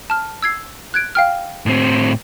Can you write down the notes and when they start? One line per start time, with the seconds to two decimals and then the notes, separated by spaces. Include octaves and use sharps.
0.10 A5 F6
0.42 E6 G#6 C7
0.94 F#6 G#6 D7
1.15 F5 G5 F6
1.66 A2 C4